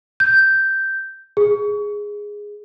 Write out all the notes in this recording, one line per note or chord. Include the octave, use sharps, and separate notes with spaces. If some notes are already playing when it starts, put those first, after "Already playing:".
G6
G#4